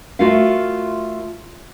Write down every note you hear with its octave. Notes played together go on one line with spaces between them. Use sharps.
A3 F4 F#4 A#4 F5